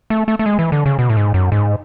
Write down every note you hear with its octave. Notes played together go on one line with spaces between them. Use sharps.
A3
A3
A3
G#3
E3
D3
C#3
B2
A2
G#2
F#2
G#2